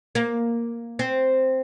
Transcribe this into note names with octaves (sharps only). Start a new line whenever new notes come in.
A#3
C4